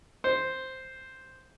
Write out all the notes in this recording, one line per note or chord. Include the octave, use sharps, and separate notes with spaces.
C5